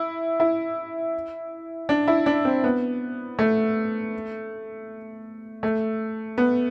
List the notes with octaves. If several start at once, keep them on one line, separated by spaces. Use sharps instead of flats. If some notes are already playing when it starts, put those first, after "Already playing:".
Already playing: E4
E4
D4
E4
D4
C4
B3
A3
A3
B3